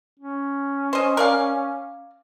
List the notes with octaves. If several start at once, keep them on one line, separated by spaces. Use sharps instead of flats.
C#4
C5 D#5
A#4 D5 F5